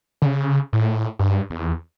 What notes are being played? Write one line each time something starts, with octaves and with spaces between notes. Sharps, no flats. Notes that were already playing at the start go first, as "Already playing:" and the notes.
D3
C#3
A2
G2
E2